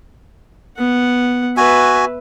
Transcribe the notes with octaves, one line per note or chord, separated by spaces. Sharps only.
B3 F#5
F#4 B4 E5 G#5